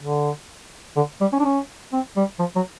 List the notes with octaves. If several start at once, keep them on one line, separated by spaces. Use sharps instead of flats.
D3
D3
G3
C#4
D4
C#4
C4
G3
F3
F#3